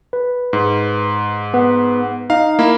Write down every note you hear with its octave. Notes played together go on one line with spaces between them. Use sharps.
B4
G#2
B3
D#4 F5
A#3 E4